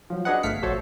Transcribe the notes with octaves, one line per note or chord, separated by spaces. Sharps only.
F3 F#3
D4 F#4 G#4 B4 D#5 F#5
G1 A3 F5 B6 C#7
A#1 F#4 A4 C5 C#5